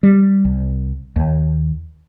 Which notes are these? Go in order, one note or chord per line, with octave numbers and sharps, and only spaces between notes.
G3
C2
D#2